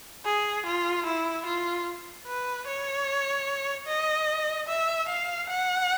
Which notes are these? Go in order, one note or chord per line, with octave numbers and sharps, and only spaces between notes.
G#4
F4
E4
F4
B4
C#5
D#5
E5
F5
F#5